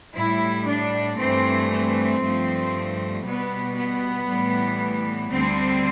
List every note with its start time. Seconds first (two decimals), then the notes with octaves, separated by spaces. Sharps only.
0.16 A2 G3 E4
0.67 D4
1.18 G2 E3 A3 C4
1.70 C4
2.22 G2 F3 A3
3.25 B2 G3 B3
3.77 B3
4.28 A2 E3 G3
5.31 D2 D3 G3 C4